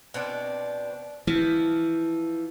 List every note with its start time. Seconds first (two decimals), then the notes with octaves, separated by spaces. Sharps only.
0.14 B2 C4 D4
1.27 E3 F3